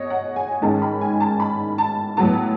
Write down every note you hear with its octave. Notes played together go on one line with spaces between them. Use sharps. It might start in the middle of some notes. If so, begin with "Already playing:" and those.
Already playing: B2 C#5 D#5
F#5
G#5
G#2 D#3 G#3 C#4 A5
B5
G#5
A5
B5
A5
A2 F#3 B3 A5